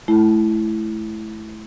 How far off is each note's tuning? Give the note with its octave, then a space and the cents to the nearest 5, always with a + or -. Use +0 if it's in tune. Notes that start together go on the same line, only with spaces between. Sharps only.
A3 -30 E4 +0